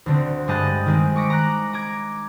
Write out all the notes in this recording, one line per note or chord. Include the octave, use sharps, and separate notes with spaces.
D2 D3 C4
G2 G#3 G4 D#5 A5 F#6
D#3 G#3 C4
C#6 D6 A#6 B6 D7
A#5 D6 F#6 A#6
A#5 D6 G#6